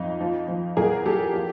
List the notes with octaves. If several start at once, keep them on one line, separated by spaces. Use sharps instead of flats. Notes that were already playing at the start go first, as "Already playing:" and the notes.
Already playing: F2 D#4 F4
F3
F3
E2 G#4 A#4
E2 G4 A4
F3